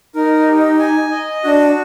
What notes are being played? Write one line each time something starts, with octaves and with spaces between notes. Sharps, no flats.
D#4 A#4
G4
G#5
D#5
D4 F#4